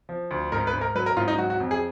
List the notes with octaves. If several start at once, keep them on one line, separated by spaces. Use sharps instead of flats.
F3
D2
G#2 A#4
B4
G#2
A#4
F#3 B4
A#4
G#2 F4
D#4
F#3 F#4
F#4
F2
G#4